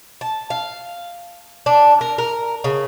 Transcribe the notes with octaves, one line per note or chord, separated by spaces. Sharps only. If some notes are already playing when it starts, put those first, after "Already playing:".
A5
F5
D4
A#4
A#4
C#3